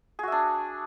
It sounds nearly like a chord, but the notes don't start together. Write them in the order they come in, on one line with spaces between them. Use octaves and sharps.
G#4 F#4 E5 D4